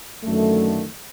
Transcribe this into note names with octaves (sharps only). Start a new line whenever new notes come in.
F#2 D3 D#3 A3